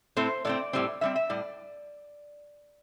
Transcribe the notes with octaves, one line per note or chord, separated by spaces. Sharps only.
A2 A3 C4 C5
A2 A3 C4 D5
A2 G3 C4
A2 G3 C4 E5
E5
A2 G3 D5